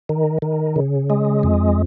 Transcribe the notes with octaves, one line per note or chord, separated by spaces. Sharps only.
D#3
D#3
C#3
G#3
F2